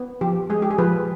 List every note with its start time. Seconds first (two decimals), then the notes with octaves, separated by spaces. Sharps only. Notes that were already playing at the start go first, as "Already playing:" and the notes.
Already playing: B3
0.21 F3 G4
0.50 G#3 G#4
0.62 G4
0.71 G#4
0.78 F3 B4